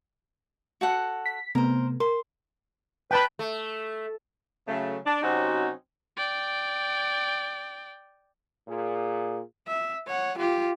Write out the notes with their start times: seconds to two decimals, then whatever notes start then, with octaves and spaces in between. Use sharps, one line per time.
0.81 F#4 A4 F#5
1.26 B6
1.55 C3 A3 B3 A#4 C5
2.00 A#4 C6
3.11 B4 G5 A5 B5
3.39 A3
4.68 C#3 F#3 A3
5.06 D4
5.23 C3 F#3 C4 C#4 D#4 F#4
6.17 D5 G5
8.68 A#2 G#4
9.67 E5
10.07 C#5 F#5
10.38 F4 G4